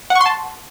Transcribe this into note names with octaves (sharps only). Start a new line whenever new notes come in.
F#5
C#6
C6
A5